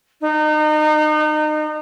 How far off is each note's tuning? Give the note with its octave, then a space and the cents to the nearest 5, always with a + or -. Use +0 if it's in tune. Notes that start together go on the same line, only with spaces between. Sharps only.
D#4 -30